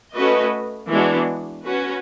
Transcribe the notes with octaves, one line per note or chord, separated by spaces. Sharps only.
A3 C#4 F#4 B4 D#5
E3 G#3 B3 D4 F#4
C#4 F#4 B4